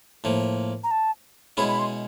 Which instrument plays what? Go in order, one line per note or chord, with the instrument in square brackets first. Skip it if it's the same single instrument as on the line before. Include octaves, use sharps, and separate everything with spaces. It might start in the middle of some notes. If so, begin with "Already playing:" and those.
[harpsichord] A2 F3 A#3
[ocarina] A#5
A5
[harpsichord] B2 G#3 C#4 E4 G#4 [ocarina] B5
[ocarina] B5
C6